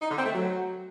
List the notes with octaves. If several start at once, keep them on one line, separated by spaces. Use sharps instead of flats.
D#4
D3
C4
A3
F#3